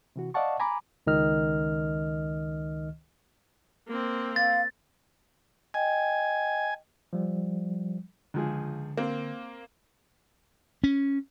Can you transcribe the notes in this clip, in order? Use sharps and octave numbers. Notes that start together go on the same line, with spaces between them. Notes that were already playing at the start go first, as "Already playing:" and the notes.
C3 E3 F#4
D5 D#5 F5 F#5 A5 C#6
G#5 A#5 B5 D6
C#2 D#3 D#5 F6
A#3 C4
F5 A6
D#5 G5 G#5
F3 G3
C#2 D3 F3 G#4
A#3 C4
C#4